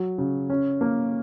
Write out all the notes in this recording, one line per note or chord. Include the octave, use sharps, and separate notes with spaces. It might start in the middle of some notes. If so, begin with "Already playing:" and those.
Already playing: F#3
C#3
C#4
A#3